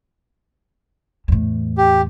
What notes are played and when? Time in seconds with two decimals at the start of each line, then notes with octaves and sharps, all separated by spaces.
1.28 E2 A2
1.78 G4